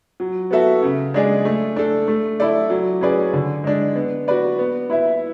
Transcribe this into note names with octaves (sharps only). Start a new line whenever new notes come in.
F#3
B3 F#4 A4 E5
C#3
G#3 D4 G#4 D5
A3
D4 A4
A3
E4 A4 D5
F#3
C#4 G#4 B4 D5
D3
G#3 D4
B3
F#4 B4 D5
B3
E4 B4 E5